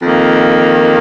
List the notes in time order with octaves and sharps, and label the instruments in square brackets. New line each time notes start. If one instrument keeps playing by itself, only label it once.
[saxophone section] F2 D#3 A#3